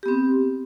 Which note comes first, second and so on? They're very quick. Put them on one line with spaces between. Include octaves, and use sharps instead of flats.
G4 B3 C4